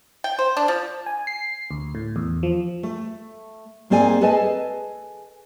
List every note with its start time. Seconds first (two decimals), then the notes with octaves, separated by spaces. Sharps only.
0.24 G5
0.39 C5
0.57 D4
0.68 F3
1.06 G#5
1.27 C7
1.71 D2
1.95 A2
2.16 E2
2.43 F3
2.83 A3
3.90 G#2 A#3 C4 G#4 D5 G#5
4.21 G#4 A4 B4 D#5 G#5 A5